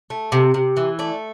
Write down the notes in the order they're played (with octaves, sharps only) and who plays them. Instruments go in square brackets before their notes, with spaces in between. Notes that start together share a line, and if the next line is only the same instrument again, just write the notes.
[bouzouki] A3
C3
C3
E3
A3 D5